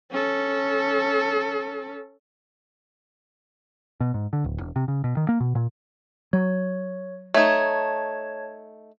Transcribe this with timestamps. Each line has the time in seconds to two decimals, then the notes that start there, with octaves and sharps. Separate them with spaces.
0.11 C#4 A4
4.00 B2
4.14 G#2
4.33 D3
4.44 D1
4.60 E1
4.76 C3
4.88 C#3
5.04 B2
5.17 D#3
5.29 A#3
5.40 B2
5.55 A#2
6.33 F#3 C#5
7.34 A3 D#4 C#5 A5 G#6